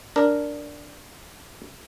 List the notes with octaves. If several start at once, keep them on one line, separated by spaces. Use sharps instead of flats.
D4 A#4